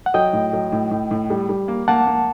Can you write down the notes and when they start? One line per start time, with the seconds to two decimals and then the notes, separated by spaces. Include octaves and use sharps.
0.06 F#5
0.14 F#3 D#5 G5
0.33 A2
0.53 F#3
0.72 A2
0.91 A2
1.11 A2
1.30 G3
1.49 G3
1.68 A#3
1.88 A#3 F#5 A5
2.07 A#3